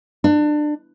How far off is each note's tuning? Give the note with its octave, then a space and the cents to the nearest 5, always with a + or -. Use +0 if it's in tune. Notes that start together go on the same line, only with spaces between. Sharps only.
D4 +25